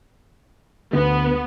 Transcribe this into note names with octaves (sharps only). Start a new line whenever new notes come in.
D2 B3